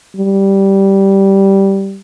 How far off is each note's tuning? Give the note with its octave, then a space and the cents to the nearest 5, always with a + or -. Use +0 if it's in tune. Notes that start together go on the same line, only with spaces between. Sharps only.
G3 -10